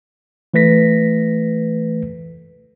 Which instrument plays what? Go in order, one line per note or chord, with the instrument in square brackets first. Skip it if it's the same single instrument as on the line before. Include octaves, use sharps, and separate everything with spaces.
[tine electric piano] E3 A3 B4 A#6 B6